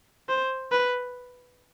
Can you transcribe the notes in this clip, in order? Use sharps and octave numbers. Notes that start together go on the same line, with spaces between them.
C5
B4